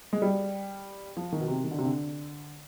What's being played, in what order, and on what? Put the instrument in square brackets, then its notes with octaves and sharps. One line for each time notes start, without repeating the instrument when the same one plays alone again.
[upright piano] G#3
G3
F3
D#3
B2
C3
D#3
D3
C3
D3